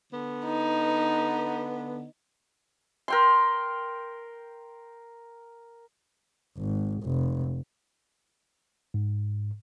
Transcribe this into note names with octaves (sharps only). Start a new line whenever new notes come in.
D3 B3
D#4
A#4 G5 C6
G#1
F1
G#2